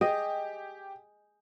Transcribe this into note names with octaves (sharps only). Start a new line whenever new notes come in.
G4 G#4 D#5